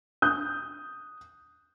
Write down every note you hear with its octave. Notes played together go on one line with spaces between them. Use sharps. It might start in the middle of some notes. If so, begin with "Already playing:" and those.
D#6 F#6 G6